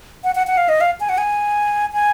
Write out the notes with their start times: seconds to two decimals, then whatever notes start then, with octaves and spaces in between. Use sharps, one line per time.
0.24 F#5
0.35 F#5
0.47 F#5
0.57 F5
0.69 D#5
0.81 F5
1.00 G#5
1.09 F#5
1.18 G#5
1.93 G#5